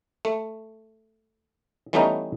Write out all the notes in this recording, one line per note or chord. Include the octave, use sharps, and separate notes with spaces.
A3
E3 G3 A3 B3 C#4 D#4